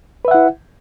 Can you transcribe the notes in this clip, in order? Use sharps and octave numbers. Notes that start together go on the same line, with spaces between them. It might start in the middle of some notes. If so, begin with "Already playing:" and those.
E4 B4 E5 F#5